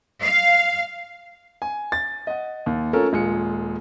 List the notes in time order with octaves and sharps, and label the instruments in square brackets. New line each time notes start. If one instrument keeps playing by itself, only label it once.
[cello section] F5
[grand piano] G#5
A6
D#5 F#5
D#2
A3 C#4 F4 A4 A#4
D#1 G#3 F4 C#7